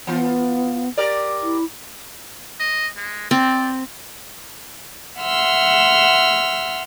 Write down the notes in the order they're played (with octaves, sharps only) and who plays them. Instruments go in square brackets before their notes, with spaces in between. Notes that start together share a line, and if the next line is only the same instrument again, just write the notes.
[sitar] E3 F4 [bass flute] B3
[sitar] G4 A#4 D5
[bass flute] E4
[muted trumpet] D#5
G#3
[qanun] C4 [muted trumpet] D5
[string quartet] E5 F#5 C6 E6 F6